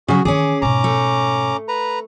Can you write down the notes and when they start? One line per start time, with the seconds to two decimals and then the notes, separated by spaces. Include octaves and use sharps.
0.08 C#3 F#3 F#4 G#4
0.25 D#3 E3 C#4 G#4 D6
0.62 G#2 B2 C#4 A#5 D6
0.84 A3
1.68 B4 A#5